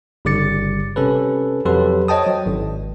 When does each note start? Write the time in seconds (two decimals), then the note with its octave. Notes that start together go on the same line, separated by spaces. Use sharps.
0.25 G1 C#3 G3 D6 A6 C#7
0.96 C3 C#4 A4 B4
1.65 F2 F#3 G4 A4 B4 C6
2.08 C5 C#5 D#5 G5 A5 D#6
2.26 F#3
2.46 G#1